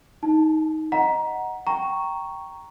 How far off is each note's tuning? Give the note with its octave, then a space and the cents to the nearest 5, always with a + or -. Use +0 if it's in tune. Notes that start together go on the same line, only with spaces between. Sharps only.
D#4 +15 A5 +0
D#5 +0 F#5 +0 A#5 +15
G5 -10 A#5 +0 C#6 +0